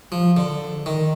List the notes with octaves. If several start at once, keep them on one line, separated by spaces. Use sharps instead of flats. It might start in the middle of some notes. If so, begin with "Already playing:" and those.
F3
D3
D#3